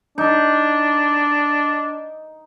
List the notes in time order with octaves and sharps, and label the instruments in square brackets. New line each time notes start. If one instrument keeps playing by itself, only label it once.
[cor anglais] D4 [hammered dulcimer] D#4